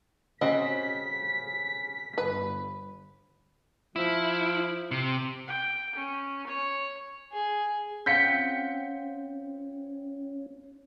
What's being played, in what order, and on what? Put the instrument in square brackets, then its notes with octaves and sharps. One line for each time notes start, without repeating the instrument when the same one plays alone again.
[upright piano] C#3 [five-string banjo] C4 F#4 D#5 [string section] B6
[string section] G1 [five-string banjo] B4
[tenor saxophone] F3 [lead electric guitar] E4
[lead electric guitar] C3
[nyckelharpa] G5
C#4
C#5
[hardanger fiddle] G#4
[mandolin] C4 F4 F#5 [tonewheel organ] C#4 [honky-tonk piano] G6 B6 C#7